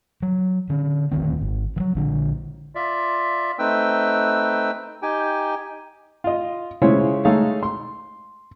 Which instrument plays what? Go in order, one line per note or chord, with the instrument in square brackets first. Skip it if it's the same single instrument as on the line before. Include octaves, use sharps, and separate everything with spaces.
[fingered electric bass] F#3
D3 C#4
D#1 D2 D#3 C4
G#1
E3 F#3
A#1 D3
[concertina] F4 D5 E5
A3 C4 D#4 B4 G5 E6
D#4 G4 G5 G#5
[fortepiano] F4 D#5
C#3 G#3 E4 F4 C5 C#5
G#3 A3 D#4 A4 C#5 F5
C6